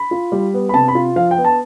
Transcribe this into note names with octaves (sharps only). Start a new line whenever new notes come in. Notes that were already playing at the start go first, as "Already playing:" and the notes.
Already playing: B5
F4
G3
B3
B5
C3 A5
B5
F4
F3 F5
G5
B3
A5